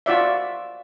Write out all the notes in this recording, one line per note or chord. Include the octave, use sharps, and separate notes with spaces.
F4 F#4 D5 E5